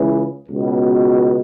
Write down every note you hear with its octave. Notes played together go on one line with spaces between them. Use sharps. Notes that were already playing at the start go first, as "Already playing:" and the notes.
Already playing: C#2 C#3 E3
C#2 B2